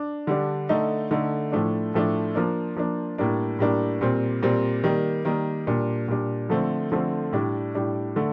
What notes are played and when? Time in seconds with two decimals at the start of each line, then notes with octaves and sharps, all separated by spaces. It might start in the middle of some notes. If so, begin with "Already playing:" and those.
Already playing: D4
0.27 D3 G3 D4
0.69 D3 A3 D#4
1.11 D3 A3 D#4
1.52 A2 F3 A3 D4
1.94 A2 F3 A3 D4
2.35 F3 A#3 D4
2.76 F3 A#3 D4
3.18 A2 G3 A#3 D4
3.59 A2 G3 A#3 D4
4.01 A#2 G3 C4
4.43 A#2 G3 C4
4.84 D#3 G3 A#3
5.25 D#3 G3 A#3
5.67 A#2 G3 D4
6.08 A#2 G3 D4
6.49 D3 F3 A3 C4
6.92 D3 F3 A3 C4
7.32 A2 G3 D4
7.75 A2 G3 D4
8.16 D3 A3